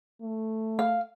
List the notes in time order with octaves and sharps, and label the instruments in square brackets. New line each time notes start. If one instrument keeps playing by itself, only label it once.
[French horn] A3
[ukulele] F5